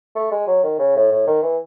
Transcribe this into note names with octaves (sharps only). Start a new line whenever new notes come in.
A3
G#3
F#3
D#3
C#3
A2
A2
D#3
E3